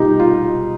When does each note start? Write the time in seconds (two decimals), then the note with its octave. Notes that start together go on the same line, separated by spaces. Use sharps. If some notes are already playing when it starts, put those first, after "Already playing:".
Already playing: B2 G3 D#4 F4 G4
0.19 F4